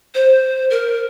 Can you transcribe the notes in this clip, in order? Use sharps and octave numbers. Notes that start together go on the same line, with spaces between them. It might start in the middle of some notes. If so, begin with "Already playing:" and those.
C5
A#4